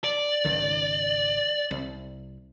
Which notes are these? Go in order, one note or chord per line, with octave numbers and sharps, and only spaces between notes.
D5
G#1 C#2 D#3
C2